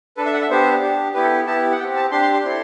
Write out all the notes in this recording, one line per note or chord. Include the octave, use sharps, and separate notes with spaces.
D4 A4 B4
E5
F#5
E5
B3 D4 G4 C5
D4 G4
B3 E4 G4 B4
A4
B3 E4 G4 A5
F#5
C4 G4 G5
A5
D4 G4 C6
C6
C6
C4 E4 A4 C6